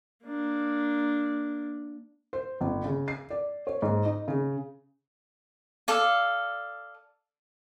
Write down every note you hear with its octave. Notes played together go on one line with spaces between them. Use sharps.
A#3 D4
C5
G1
C#3
C7
D5
C#5
G#2
D#4
C#3
A4 D5 F5